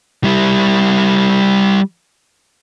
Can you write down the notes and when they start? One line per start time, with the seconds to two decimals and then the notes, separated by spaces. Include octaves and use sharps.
0.24 G3 E4